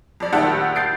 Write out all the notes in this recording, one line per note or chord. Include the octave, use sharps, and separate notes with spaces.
F2 D5
A#1 D#3 G4 E5 F#5 A5
G6 A6 C7 D7